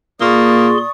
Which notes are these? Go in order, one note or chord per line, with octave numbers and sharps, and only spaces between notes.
A#2 A#3 G#4 D5 C6 C#6 D#6